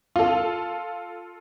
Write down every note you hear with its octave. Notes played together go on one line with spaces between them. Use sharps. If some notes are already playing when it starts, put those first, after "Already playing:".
F4 A4